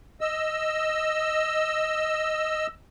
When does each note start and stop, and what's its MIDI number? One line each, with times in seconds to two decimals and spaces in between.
0.21 2.67 75
0.21 2.67 88